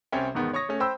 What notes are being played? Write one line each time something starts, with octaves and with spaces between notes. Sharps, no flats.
C2 C4 C#4 C#5 G5
E2 G#2 D#3 B3
C#5 C#6 D#6 A#6
A3 C#4
C5 G5 B5 E6